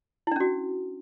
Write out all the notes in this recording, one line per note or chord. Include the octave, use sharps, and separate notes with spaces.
C#4 D4 E4 F#4